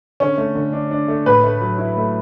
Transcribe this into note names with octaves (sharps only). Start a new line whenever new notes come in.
D3 C#4
A3
D3
D4
D4
A3
A2 B4
A3
F#3
E4
A3